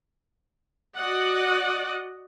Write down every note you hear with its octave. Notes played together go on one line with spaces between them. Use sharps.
F#4 D5 D#5 F#5